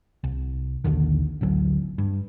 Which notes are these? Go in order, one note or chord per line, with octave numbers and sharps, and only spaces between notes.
C2
A#1 D#2 D3 D#3
A1 D2 F#3
G2